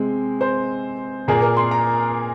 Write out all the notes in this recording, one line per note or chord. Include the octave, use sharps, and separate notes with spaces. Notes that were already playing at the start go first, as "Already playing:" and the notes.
Already playing: C3 G#3 C4
C5
A#2 A#3 G#4
A#4
C6
A#5